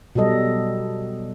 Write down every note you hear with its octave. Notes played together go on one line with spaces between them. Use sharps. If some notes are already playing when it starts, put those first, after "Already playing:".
B2 F#3 G3 A4 D#5